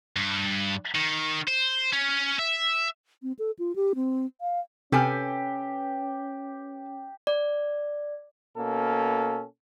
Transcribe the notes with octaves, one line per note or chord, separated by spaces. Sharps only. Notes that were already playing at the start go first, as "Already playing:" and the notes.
G2
D#3
C5
C#4
E5
C4
A4
F4
G4
C4
F5
C3 C#4 G4 A4 B4 G#5 F6
D5
B2 A#3 C#4 A4